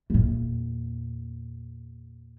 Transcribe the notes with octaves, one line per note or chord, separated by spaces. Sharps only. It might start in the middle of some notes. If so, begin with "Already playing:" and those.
E2 A#2